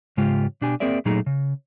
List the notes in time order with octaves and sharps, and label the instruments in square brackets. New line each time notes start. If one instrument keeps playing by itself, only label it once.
[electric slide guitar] G#2 C#3 G#3 F4 G4
B2 D4 G4 G#5
A#3 C4 G#4 A#4 D5 E5
A#2 F#3 A3 D#4 G#4 A#5
C#3